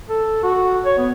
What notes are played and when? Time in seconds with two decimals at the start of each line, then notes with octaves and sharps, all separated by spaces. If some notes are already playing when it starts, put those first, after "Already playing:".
0.09 A4
0.43 F#4
0.85 C#5
0.98 B3